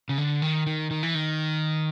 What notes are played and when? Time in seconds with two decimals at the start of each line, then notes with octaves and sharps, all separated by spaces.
0.09 C#3
0.18 D3
0.42 D#3
0.66 D#3
0.91 D#3
1.03 E3
1.15 D#3